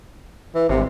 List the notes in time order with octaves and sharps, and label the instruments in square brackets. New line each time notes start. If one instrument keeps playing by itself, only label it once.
[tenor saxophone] E3
[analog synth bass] G#1 [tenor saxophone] C3